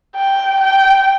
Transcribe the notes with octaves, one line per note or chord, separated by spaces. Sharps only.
G5
G5